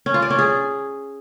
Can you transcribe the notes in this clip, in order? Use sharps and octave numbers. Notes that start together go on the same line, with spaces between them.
C#4
F4
D5
C#4
G#4